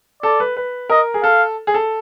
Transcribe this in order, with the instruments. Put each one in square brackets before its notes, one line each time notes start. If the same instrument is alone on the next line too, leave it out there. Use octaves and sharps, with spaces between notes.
[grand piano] A4 [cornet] D5
[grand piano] B4
B4
[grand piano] A#4 [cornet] D#5
[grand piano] G#4
[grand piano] A4 [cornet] F5
[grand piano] G#4
A4